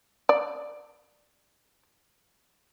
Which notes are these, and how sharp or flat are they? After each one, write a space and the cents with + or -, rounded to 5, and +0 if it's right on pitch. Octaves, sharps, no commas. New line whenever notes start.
D5 +10